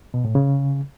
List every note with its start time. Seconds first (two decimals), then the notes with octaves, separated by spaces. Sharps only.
0.14 B2
0.25 A2
0.35 C#3